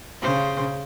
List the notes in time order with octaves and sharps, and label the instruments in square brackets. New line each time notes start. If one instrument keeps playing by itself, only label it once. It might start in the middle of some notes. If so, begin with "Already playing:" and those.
[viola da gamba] C#3 C5